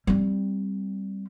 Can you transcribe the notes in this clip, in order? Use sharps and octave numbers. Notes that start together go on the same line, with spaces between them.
G3 C4